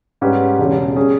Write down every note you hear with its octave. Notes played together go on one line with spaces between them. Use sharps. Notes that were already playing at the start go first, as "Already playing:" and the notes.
G#2 G3 C#4 G4 B4
E1 E2 C#3
G3 C#4 G#4